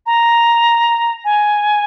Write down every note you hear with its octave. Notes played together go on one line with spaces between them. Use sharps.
A#5
G#5